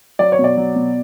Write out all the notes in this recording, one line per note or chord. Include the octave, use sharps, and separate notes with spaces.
F#3 D5
C#5
B2
D5
F#3
B2